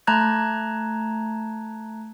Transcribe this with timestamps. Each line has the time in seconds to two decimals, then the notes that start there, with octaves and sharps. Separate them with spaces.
0.07 A3 A5 A#5 F#6 G#6